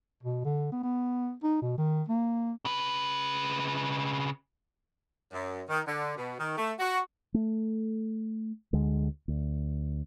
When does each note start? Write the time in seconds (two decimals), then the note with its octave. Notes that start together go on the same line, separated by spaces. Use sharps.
0.23 B2
0.45 D3
0.72 B3
0.83 B3
1.43 D#4
1.62 B2
1.78 D#3
2.09 A#3
2.65 C#3 B4
5.32 F#2
5.69 D#3
5.87 D3
6.17 B2
6.40 D#3
6.58 A3
6.79 F#4
7.34 A3
8.73 D2 D3 G#3
9.28 D2